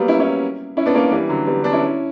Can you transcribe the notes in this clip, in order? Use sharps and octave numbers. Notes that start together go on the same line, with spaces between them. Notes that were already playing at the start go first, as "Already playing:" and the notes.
Already playing: F#3 G3 A#3 B3
C#4 E4
C#4 E4
C#4 E4
B3 D4
A#3 C#4
E3 G3
D3 F#3
G3 B3
B3 D4
C#4 E4